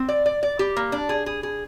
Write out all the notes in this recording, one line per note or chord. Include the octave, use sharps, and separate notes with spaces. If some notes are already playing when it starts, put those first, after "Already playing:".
Already playing: C4
D5
D5
D5
G4
A#3
D4
G#4
G#4
G#4